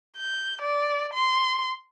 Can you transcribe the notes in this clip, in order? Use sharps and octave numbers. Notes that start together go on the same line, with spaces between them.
G6
D5
C6